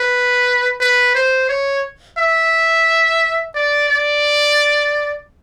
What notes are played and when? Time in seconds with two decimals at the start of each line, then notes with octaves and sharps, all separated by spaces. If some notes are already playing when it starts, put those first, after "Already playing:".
Already playing: B4
0.80 B4
1.15 C5
1.49 C#5
2.18 E5
3.55 D5
3.89 D5